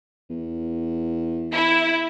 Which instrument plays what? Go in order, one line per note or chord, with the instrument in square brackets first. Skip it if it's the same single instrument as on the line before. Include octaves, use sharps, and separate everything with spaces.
[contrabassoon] E2
[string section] E4